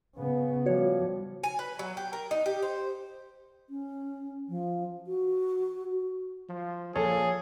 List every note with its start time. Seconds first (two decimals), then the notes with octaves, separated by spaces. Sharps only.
0.16 C#3 B3
0.66 F3 G3 F#4 C#5
1.43 G#5
1.59 B4
1.79 F#3
1.97 G4
2.13 A#4
2.31 D#4
2.46 G4
2.63 C5
3.70 C#4
4.49 F3
5.07 F#4
6.49 F3
6.96 A#2 F3 G#4 A4 C#5